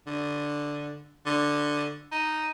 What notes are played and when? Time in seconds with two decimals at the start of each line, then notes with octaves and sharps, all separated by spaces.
0.07 D3
1.26 D3
2.12 D#4